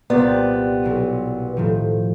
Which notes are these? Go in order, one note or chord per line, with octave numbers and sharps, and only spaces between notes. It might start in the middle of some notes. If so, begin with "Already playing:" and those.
C2 A#2 B3 G4 C5 D5
B1 E4 D#7
A2 D#3 F3